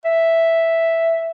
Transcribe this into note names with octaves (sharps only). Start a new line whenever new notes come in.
E5